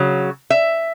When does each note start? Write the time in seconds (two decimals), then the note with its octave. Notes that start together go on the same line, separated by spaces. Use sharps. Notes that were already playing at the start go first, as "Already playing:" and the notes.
Already playing: C#3 F#3
0.50 E5